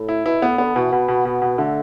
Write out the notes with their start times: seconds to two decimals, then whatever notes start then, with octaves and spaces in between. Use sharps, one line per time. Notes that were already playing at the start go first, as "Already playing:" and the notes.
Already playing: A2
0.09 E4
0.25 B2 E4
0.42 A2 B3
0.58 D3 B3
0.75 B2 E3
0.92 B2 B3
1.08 B2
1.25 B2
1.42 B2
1.58 D3 A3